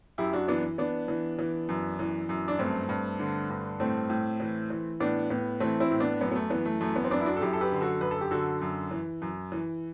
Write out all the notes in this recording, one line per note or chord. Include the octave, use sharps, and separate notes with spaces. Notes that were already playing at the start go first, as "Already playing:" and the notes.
F#2 E4 G4
D4 F#4
E3 B3 D4
E3 B3 D4
E3
E3
F#2
E3
F#2
D4
G2 A3 C4
G2
D3
G2
A2 A3 C4
A2
E3
E3
A2 B3 D4
A2 B3
E3 A3 C4
C4 E4
A2
B3 D4
F#2 B3
B3
A3
E3 B3
A3
F#2 A3
B3
C4
F#2 B3 D4
E4
D4 F#4
A4
F#2 E4 G4
A4
G4 B4
D3
F#4 A4
F#2 B4
A4
G4
D3 F#4 A4
F#2
E3
F#2
E3